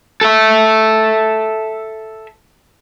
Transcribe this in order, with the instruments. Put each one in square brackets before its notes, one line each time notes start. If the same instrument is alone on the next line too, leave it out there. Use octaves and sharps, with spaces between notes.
[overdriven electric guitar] A4 E5